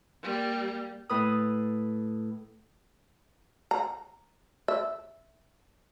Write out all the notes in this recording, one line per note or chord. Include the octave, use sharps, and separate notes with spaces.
G3 A#3
A2 B4 D#6
A#5
E5